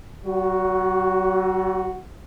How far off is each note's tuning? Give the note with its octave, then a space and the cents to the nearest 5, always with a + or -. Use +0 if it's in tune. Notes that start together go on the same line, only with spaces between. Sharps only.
F#3 +45 F#4 +0